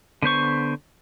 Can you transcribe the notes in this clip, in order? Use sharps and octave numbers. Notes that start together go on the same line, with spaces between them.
D3 B3 C5 C#6